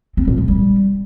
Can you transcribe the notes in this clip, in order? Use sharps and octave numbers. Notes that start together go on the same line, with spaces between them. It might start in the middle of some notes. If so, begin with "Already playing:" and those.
C4
A#2
F3
G3